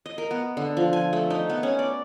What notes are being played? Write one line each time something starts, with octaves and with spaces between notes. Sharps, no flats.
D#5
A#4
B3
D3
F3
G#5
A3
D#4
B3
C#4
D5